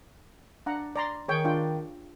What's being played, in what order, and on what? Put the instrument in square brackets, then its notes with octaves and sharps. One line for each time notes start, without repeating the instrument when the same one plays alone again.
[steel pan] D4 F#5 A#5
D5 A#5 C6
[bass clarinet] D#3 [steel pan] G#4 C#5 G5
[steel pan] D4 F4 G5